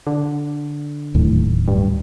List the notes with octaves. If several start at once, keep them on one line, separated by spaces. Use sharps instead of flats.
D3
D1 D#2 A2
G2